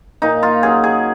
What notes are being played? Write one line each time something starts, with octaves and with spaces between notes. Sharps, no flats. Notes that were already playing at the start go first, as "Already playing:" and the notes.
A#2 D#4
F4
F#3 C#4 G#4
G#4